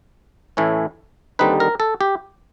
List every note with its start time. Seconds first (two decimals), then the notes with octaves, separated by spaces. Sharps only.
0.57 A2 E3 A3 C#4 E4
1.39 D#2 D3 G3 C4 D#4 B4
1.60 A#4
1.80 A4
2.01 G4